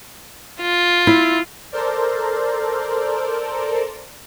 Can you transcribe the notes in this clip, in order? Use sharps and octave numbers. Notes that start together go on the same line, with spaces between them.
F4
E4
A4 A#4 C5 D5